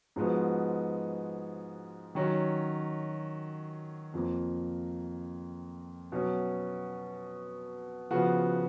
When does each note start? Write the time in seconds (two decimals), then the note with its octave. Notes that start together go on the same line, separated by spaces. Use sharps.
0.16 G#2 F3 G#3 B3 F#4
2.15 D#3 F#3 C#4
4.14 F2 F3 A#3
6.12 B2 F#3 C#4
8.11 C#3 F3 B3 F#4